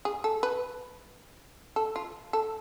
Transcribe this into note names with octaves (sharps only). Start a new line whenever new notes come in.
G#4
A4
B4
A4
F4
A4